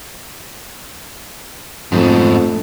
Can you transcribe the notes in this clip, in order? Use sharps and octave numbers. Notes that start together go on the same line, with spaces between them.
F2 G#2 B2 A3 D4